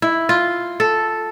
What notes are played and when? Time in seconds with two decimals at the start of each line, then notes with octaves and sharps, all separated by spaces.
0.02 E4
0.29 F4
0.80 A4